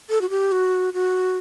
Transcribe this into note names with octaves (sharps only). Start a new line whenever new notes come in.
A4
F#4
G4
F#4
F#4